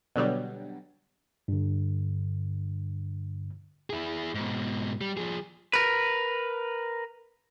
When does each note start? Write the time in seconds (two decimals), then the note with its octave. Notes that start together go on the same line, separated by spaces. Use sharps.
0.16 B2 D3 F#3 G3
1.48 G2 D3
3.90 E4 G#4
4.35 G#2 B2
5.01 G3
5.17 F3 G#4
5.73 A#4 B4